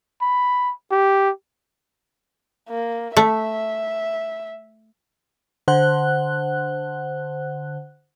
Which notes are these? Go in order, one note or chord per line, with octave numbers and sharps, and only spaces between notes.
B5
G4
A#3
A3 E5
D3 C5 F#5 F#6